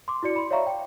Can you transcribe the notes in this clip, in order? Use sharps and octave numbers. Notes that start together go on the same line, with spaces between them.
C6 D6
E4 F#4 D5 C#7
B5 C6
C#5 D5 E5 F5 A#5 C#6
G5